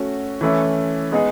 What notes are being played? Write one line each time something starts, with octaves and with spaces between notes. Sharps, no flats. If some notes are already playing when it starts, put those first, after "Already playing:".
Already playing: A3 C#4 F#4
E3 A3 C#4 E4
G#3 B3 D#4 G#4